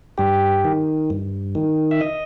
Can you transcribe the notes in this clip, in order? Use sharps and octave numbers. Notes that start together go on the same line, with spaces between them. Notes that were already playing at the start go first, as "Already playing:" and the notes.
G2 G4
D#3
G2
D#3
E5
D#5